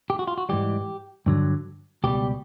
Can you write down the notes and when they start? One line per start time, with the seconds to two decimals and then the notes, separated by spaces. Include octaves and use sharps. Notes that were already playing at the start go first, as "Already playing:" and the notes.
0.10 G4
0.19 F#4
0.28 F4
0.38 F#4
0.49 G#2 E3 G3 G4
1.26 G2 D3 F#3
2.04 C#2 B2 G3 G4